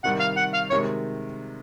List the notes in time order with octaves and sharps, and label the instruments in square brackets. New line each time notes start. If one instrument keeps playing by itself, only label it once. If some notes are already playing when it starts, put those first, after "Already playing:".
[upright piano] C3 D#3 G3 [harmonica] F#5
[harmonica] F5
F#5
F5
[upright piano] C3 D#3 G#3 [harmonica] C#5